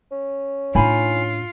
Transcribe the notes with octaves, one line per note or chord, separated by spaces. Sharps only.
C#4
A2 D4 D#4 F4 G#5 B5